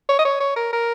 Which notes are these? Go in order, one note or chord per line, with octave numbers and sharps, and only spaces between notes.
C#5
D#5
C#5
C#5
A#4
A#4